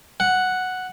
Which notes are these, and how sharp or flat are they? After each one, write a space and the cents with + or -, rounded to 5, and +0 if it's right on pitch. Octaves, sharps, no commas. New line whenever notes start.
F#5 +0